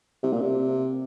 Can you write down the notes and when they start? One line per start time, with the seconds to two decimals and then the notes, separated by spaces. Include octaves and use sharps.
0.23 C3
0.33 A#2
0.41 C3